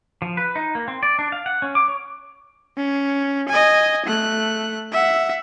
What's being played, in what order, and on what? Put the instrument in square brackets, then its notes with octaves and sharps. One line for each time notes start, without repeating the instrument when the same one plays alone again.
[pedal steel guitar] F3
B4
D#4
A#3
C4
D5
D4
F5
F#5
C#4
D6
C#5
[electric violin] C#4
D#5 G#5
A3 F#6
E5 F#5